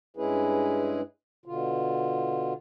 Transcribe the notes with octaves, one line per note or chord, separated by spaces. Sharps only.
G2 G#3 C#4 E4 G#4 B4
B2 D3 F4